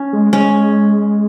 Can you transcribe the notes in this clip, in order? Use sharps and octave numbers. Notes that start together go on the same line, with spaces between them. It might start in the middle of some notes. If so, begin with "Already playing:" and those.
Already playing: C#4
G#3
G#3 C#4